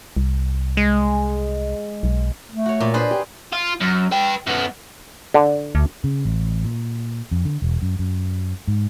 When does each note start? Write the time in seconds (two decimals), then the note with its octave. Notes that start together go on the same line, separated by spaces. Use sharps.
0.17 C2
0.77 G#3
2.03 B1
2.50 A3
2.66 F#4 C#5
2.80 A#2
2.94 D4 G#4 B4 C5
3.11 G4
3.53 F4
3.81 F#2
4.12 B4 G5
4.47 F#2 B3
5.34 D3
5.75 D2
6.04 C#3
6.25 A1
6.64 A#2
7.31 F2
7.45 D3
7.62 E1
7.82 F#2
7.99 F#2
8.68 G#2